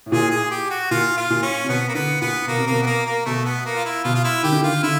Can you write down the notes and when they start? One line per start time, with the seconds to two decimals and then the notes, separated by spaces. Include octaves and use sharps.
0.06 A2
0.12 A#2 G#4
0.31 G#4
0.51 G4
0.71 F#4
0.91 A#2 F4
1.17 F4
1.30 A#2
1.43 C#4
1.64 C3
1.69 B2 B3
1.89 A#3
1.94 D3 B3
2.21 A#2 B3
2.47 B2 A#3
2.58 C3
2.67 B2 A#3
2.82 B3
2.87 A#3
3.06 A#3
3.26 B2 A3
3.45 B3
3.66 A#3
3.76 F4
3.85 E4
4.04 B2 F4
4.15 F4
4.24 E4
4.43 D#3 G4
4.52 D3
4.61 D#3 F4
4.83 D3 E4